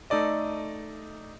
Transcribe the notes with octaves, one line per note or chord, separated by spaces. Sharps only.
A3 D#4 A4 D5 D#5